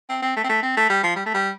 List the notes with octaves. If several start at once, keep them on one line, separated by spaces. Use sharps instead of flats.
C4
C4
A3
C4
A3
C4
A3
G3
F3
G3
A3
G3